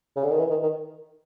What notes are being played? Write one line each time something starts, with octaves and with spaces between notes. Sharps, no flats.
C#3
D3
D#3
E3
D#3
D#3